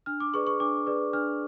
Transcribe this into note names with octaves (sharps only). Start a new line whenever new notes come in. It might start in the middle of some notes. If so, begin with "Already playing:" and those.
D4 F6
D6
G#4 B4 D5 C#6
C#6
D4 D6
G#4 B4 D5
D4 F6